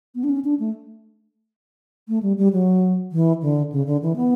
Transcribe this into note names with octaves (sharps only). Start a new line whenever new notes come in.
B3
D4
C#4
D4
A3
A3
G3
G3
F#3
E3
D3
C#3
D3
E3
B3